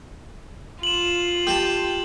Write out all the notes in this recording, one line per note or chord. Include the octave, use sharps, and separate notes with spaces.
F4 E7 F#7
G4 G5 A5